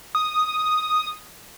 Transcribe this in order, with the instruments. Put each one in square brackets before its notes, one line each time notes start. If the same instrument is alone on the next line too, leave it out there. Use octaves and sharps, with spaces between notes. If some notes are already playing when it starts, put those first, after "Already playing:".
[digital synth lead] D#6